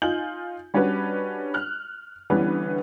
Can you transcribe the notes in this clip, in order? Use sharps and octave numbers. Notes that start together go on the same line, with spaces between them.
D#4 F4 G#5 G6 F#7
G3 C#4 D4 F#4 B4
F6 F#6
D3 E3 G3 B3 C#4 B4